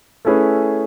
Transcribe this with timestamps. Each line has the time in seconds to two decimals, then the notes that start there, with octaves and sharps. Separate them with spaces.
0.25 A3 C#4 E4 G#4 B4